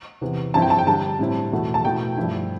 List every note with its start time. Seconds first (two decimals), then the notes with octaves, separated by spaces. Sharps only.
0.21 E2 C3 E3 B3
0.54 G2 F3 C4 E4 A5
0.62 G5
0.70 A5
0.78 G5
0.87 D3 G3 D4 A5
1.19 A2 G3 C4 E4
1.52 E2 B2 A3 E4
1.74 A5
1.85 B2 A3 E4 G5
2.17 G2 F3 A3 E4